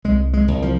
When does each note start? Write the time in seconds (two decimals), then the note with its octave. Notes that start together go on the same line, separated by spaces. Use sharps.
0.04 C2 G#3
0.33 G#3
0.48 C2
0.62 F3